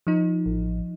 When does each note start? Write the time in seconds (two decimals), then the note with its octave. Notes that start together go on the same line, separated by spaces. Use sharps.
0.07 F3 D#4
0.46 A1